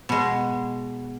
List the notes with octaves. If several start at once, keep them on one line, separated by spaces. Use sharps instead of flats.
B2 G#3